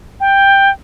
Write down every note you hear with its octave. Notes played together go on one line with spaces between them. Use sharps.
G5